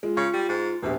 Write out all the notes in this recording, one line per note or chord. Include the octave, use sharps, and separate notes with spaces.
G#3 F4
C#3 C#6
G3
G#2
E1 A#1 B2 G4